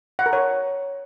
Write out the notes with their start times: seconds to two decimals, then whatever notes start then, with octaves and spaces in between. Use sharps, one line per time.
0.19 F#5
0.26 A#4
0.33 C#5